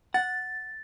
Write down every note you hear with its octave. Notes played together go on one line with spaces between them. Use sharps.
F#5 A6